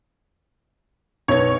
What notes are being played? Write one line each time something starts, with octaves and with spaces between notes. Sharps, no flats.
B1 B4 C#5 G#6